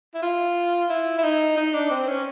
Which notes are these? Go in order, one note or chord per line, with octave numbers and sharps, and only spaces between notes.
E4
F4
E4
E4
D#4
D#4
D4
C4
C#4